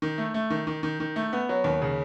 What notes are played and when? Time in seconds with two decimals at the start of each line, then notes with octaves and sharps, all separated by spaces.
0.02 D#3
0.18 A3
0.34 A3
0.50 D#3
0.67 D#3
0.83 D#3
1.00 D#3
1.16 A3
1.33 B3
1.49 F#3
1.64 D#2
1.82 C#3